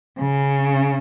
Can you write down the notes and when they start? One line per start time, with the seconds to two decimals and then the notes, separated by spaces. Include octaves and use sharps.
0.19 C#3